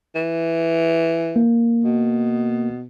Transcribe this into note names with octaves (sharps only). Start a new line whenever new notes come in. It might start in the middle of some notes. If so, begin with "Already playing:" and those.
E3
A#3
B2